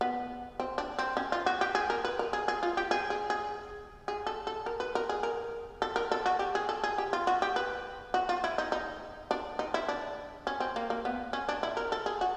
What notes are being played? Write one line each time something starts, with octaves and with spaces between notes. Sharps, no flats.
B3
C4
D4
C4
C#4
F4
F#4
G4
G#4
A#4
B4
A#4
G#4
G#4
F4
G4
G#4
G#4
G#4
G#4
A4
A4
A#4
B4
A#4
G#4
A#4
A4
A#4
A4
F#4
G4
G#4
A4
G#4
G4
F4
F#4
G4
B4
F#4
F4
E4
D#4
D#4
D4
D#4
E4
D4
C#4
C4
A#3
A#3
B3
C#4
D4
E4
A#4
A4
G#4
F#4